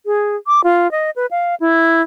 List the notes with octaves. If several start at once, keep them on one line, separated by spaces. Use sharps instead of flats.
G#4
D6
F4
D#5
B4
F5
E4